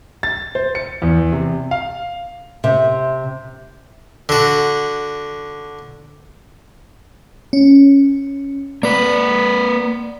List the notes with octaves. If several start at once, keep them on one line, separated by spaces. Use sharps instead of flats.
A6
C5
C#7
E2
C3
F5
C3
D3 F#4
C#4
A#3 B4 D5